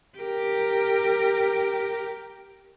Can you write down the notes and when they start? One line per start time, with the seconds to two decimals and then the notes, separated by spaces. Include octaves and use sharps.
0.18 G4 A#4